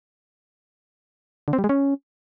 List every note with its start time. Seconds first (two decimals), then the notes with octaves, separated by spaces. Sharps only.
1.48 D3
1.53 C4
1.59 G3
1.64 G#3
1.69 C#4